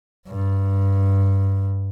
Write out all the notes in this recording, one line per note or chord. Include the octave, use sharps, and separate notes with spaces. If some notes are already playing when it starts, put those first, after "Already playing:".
G2